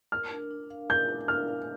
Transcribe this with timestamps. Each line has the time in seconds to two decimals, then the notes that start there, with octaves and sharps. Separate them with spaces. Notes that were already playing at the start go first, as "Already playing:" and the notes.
0.12 A#4 F6
0.32 D4
0.51 D4
0.70 F5
0.89 A#4 G6
1.09 D4
1.28 D4 F6
1.48 F5